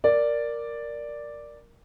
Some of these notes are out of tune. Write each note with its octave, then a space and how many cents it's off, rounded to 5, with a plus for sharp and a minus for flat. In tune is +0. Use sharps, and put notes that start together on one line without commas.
A#4 +0 D5 +0